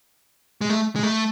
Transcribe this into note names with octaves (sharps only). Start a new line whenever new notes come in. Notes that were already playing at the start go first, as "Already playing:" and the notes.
G#3
A3
G#3
A3